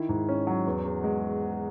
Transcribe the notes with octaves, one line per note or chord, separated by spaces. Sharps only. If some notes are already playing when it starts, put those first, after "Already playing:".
Already playing: D#3 E4
G#2
C#4
F#3
E2
E2
G#3